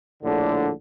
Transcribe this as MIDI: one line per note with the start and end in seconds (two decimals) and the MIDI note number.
0.22 0.71 34
0.22 0.71 45
0.22 0.71 50